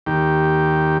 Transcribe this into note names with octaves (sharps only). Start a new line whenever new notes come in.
D#2 G4